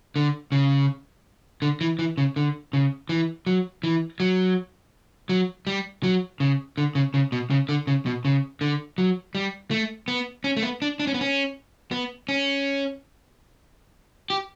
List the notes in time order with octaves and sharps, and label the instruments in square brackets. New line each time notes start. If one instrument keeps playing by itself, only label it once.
[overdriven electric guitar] D3
C#3
D3
E3
E3
C#3
D3
C#3
E3
F#3
E3
F#3
F#3
G3
F#3
C#3
D3
C#3
C#3
B2
C#3
D3
C#3
B2
C#3
D3
F#3
G3
A3
B3
C#4
A3
B3
D4
D4
C#4
B3
C#4
B3
C#4
G4